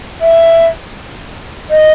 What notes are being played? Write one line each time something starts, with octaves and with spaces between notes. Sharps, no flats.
E5
D#5